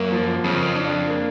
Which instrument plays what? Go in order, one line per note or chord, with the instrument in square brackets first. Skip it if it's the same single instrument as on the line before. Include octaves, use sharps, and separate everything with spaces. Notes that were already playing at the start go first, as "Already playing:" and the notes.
Already playing: [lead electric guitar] F#2 [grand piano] A#3
[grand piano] F3
[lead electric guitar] F2 [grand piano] C#3
[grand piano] D4
A#3